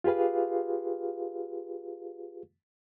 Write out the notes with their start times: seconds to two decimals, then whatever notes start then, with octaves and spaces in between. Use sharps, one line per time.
0.04 F4 G4 G#4 B4 F5